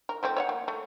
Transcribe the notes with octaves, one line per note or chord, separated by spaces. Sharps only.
A#4
F3 A3 C4
C#5 E5 F#5
A#3
A3